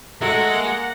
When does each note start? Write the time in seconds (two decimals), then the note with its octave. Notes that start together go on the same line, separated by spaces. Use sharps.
0.21 G#3 A3 F#4 A4 F#5 A#5
0.54 A#3